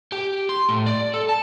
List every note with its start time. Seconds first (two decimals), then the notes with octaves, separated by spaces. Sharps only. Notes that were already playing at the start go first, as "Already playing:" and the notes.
0.12 G4
0.49 C6
0.69 A2
0.86 D5
1.14 A4
1.29 A5